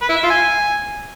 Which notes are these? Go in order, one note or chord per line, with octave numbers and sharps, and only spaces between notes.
B4
E4
E5
F4
G#5